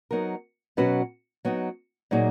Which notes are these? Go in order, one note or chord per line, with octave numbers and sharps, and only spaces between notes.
F#3 B3 D#4 A#4
B2 F#3 C#4 F#4 B4
F#3 B3 D#4
A#2 F#3 A#3 D#4 G#4